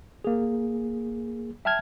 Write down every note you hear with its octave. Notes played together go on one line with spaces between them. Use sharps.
A#3 G#4
E5 G5 A5 F6 G#6